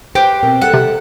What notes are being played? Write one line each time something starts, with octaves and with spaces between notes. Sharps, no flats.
G4 B4 C5 G5
B2 C4 A#4
G3 A#3 A4 F#5
C3